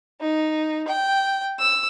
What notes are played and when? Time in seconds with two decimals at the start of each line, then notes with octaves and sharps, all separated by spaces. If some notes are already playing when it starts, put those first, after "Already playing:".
0.21 D#4
0.88 G5
1.59 E6